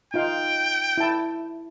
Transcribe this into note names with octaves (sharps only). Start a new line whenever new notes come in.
D#4 F4 F5 G5
E4 A5